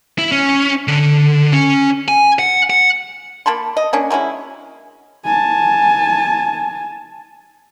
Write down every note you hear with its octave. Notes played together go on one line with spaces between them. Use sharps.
E4
C#4
D3
C#4
G#5
F#5
F#5
A#3 A5 B5 C6
D#5
A#3 C#4 D4
F#3 G#3 C#4 E4
G#5 A5